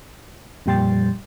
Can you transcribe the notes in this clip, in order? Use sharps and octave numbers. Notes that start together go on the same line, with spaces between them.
F2 A#2 G3 G5 C6 A6